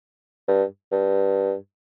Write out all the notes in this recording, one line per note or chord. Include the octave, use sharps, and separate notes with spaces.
G2
G2